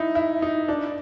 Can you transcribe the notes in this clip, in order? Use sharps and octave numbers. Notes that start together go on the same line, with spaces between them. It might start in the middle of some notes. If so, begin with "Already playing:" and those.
Already playing: D#4 E4
E4
D#4
D4